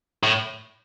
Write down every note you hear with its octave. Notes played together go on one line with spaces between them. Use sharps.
A2